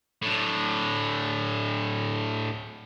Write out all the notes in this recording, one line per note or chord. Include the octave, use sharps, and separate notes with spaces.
A2 D3